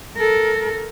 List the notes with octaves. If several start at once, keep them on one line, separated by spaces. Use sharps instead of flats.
A4 A#4